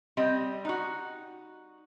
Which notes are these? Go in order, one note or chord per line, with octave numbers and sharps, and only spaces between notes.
G3 C4 D#5
D#4 F#4